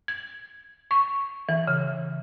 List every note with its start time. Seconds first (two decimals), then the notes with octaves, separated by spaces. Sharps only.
0.08 G#6
0.91 C#6
1.49 E3
1.67 C#3